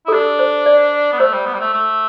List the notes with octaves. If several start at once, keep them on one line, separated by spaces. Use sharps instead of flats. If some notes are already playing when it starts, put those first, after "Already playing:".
E4 A4
D4 G4
C5
D5
B3
A3 C5
G3
B3
G3
A3
A3